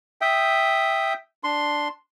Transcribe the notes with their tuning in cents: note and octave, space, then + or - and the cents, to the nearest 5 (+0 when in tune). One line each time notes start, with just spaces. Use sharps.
E5 +0 G5 +0 D#6 +0
D4 +0 C6 +0